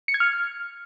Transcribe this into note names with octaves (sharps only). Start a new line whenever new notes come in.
C#7
G#6
F6